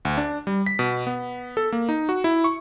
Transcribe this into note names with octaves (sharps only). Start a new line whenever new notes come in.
D2
D4
G3
B6
B2
B3
A4
A#3
D#4
F#4
E4
C#6